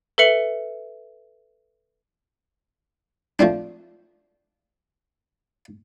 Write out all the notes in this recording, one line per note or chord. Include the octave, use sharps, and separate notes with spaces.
A4 B4 E5 C#7 F#7
F3 A3 C4 D4